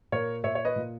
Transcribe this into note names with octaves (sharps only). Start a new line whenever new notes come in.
A#2 A#4 C#5
A#2 C#5 E5
C#5
B4 D#5
A#2